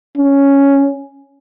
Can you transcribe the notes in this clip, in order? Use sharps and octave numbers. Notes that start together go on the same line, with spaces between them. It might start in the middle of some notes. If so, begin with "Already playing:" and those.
C#4